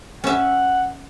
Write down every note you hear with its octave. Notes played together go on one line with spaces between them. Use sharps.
C#4 E5 F#5